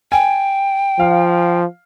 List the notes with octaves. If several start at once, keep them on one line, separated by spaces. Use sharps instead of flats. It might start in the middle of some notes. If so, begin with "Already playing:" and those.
G5 G#5
F3 F5